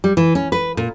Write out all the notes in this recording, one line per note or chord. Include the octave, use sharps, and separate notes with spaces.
G3
E3
C#4
B4
A#2